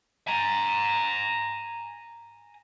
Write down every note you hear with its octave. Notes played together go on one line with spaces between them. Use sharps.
G#5 A#5